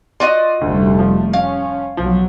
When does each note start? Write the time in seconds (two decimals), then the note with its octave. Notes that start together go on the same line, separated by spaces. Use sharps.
0.20 F4 F#4 D5 D#5
0.61 F1 D2 G3 A3
0.99 F3
1.33 C#4 F5
1.97 B1 F3 F#3